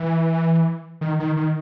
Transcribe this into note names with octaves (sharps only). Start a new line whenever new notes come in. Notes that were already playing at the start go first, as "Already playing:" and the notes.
Already playing: E3
D#3
D#3
D#3